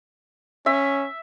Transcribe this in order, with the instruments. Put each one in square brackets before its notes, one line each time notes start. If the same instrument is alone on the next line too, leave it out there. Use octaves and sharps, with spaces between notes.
[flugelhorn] C#4 [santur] E5